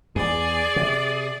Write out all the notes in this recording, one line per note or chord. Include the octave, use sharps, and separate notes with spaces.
E2 G#4 D5
C3